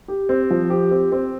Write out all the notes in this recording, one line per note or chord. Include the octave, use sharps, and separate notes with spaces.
G4
C4
F3
G4
C4
C4